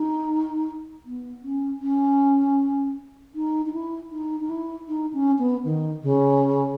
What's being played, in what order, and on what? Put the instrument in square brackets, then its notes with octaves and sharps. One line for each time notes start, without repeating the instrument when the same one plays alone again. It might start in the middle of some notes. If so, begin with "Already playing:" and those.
Already playing: [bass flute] D#4
B3
C#4
C#4
D#4
D#4
E4
D#4
D#4
E4
D#4
C#4
B3
D#3
C#3